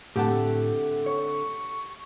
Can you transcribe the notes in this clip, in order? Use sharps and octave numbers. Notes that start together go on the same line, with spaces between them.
A2 D3 A3 C4 G4 F#5 A5
C#5 C#6